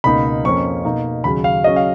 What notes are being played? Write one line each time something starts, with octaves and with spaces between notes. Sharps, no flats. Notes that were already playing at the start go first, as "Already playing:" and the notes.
C#2 B2 A#3 D#4 B5
F2 F3 A#3 C#4 C#6
B2 A#3 D#4
D#2 C#3 F#3 B5
F5
C#3 F#3 C#4 D#5
F5